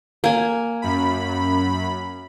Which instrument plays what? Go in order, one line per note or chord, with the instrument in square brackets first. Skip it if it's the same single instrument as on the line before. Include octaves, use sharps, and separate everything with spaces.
[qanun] A#3 G#5
[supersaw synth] F#2 B5